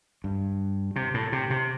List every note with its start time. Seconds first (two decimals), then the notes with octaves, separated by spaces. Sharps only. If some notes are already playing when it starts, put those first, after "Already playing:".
0.24 G2
0.96 C3
1.14 A2
1.32 C3
1.50 C3